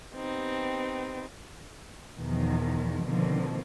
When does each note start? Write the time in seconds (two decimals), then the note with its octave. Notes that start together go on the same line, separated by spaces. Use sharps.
0.14 B3 C4 D#4 G4
2.17 E2 B2 D#3 F3
3.03 B2 D3 D#3 F3 A#3 C4